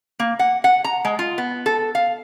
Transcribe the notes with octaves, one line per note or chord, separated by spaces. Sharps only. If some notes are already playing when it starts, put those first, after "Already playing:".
A#3
F#5
F#5
A#5
G#3
F4
B3
A4
F5